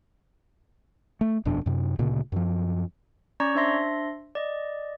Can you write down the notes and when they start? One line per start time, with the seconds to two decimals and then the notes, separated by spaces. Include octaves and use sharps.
1.21 A3
1.45 D#1 F2 B2 D4
1.66 F#2 C3
1.99 D2 A#2 C#3
2.32 F#2 F3
3.40 C#4 D5 A#5 C#6 G#6
3.55 D4 C5 E5 C6 A#6
4.35 D5 D#5